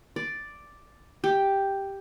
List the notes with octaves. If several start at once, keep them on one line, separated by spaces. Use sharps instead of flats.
D5
G4